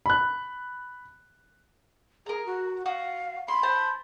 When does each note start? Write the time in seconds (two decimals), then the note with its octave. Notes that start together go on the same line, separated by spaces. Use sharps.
0.06 B5 F#6
2.26 G#4 A#4 A#5
2.46 F#4
2.86 F#4 F5
3.48 B5 C6
3.63 C5 A5